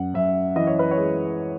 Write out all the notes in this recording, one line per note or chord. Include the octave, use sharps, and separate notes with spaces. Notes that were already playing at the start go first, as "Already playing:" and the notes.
Already playing: F#2 F#5
F#2 E5
E3 D#5
C#5
B4
C#5
G#3